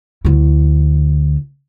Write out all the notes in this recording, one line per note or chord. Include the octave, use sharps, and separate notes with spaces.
D2 E4